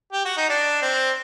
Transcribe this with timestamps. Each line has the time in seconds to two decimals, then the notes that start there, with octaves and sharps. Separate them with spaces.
0.12 G4
0.25 F#4
0.37 D#4
0.49 D4
0.82 C4